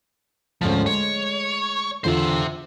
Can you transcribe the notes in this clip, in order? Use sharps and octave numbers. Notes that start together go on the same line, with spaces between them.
D2 G#2 F3 C#4
G#3 C#5
E2 D3 F4 C5 E5